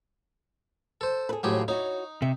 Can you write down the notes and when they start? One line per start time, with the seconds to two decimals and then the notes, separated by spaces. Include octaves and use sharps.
1.01 A4 C5
1.29 G#4 A4 B4
1.43 D#2 A2 F3 F#3 G4 G#4
1.68 D#4 E4 F#4 C#5
2.22 C3 E5